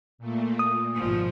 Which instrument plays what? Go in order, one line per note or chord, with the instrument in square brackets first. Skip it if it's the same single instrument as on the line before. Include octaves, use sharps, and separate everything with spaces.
[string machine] A#2 A3 A#3
[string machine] A#2 [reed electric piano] D#6
[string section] G#1 B2 F3